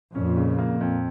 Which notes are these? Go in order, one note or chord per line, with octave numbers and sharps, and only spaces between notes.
F2 A#2 C#4
C#3
A#3
F2